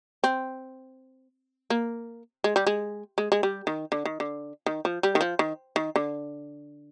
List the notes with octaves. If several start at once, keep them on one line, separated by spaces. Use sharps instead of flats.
C4
A#3
G#3
G3
G#3
G#3
G#3
G3
D#3
D3
D#3
D3
D#3
F3
G3
D#3
F3
D#3
D#3
D3